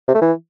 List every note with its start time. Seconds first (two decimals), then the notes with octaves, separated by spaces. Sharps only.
0.08 C3
0.15 A3
0.21 E3